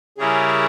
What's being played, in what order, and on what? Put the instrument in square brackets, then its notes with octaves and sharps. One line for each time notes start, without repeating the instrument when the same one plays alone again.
[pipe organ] C#3 G3 C#4 E4 A#4 [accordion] G#4